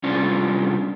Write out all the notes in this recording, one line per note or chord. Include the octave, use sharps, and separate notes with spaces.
C3 G3 C#4 D4 F4